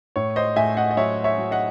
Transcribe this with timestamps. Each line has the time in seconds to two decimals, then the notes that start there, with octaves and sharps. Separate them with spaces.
0.16 A2 C#5
0.36 C5 D#5
0.56 A2 E5 G#5
0.77 D#5 F#5
0.91 D#5
0.97 F#3 C#5 E5
1.24 C#5 E5
1.38 F#3
1.51 D#5 F#5